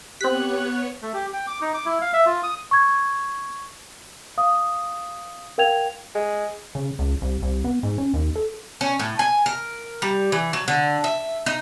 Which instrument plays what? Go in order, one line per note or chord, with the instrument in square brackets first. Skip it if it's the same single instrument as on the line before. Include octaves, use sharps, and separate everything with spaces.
[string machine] B3 C#5 [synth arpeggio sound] C4 B6 [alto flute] G4 [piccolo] F#6
[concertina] A3
G4
G5
D6
D#4
D6
E4
F5
E5
F4
D#6
[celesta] C#6 G#6
F5 D#6
A#4 F5 G5 G#6 F7
[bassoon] G#3
[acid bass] C#3
C#2
C2
C2
B3
G#2
C#4
D#2
A4
[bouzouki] C#4
A2
G#5
A#4
G3
E3
F#3
D3
E5
D#4